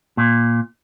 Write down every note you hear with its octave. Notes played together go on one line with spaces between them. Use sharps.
A#2